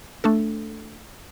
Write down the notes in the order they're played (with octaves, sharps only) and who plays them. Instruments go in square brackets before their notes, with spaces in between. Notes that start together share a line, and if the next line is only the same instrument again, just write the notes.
[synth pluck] A3 D4 A4